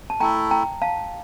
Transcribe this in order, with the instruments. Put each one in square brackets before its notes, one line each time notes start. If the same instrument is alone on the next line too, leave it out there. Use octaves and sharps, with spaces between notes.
[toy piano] A5
[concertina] A3 E4 A4 [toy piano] G5 A#5
[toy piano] G5 A#5
F5 A5